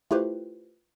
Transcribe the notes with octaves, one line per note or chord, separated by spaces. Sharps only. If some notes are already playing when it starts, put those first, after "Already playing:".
A3 E4 F4 G4 B4 C5